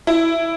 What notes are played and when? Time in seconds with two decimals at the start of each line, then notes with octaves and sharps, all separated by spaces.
0.07 E4